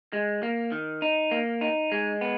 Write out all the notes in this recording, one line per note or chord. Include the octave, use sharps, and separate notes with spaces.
G#3
A#3
D#3
D#4
A#3
D#4
G#3
B3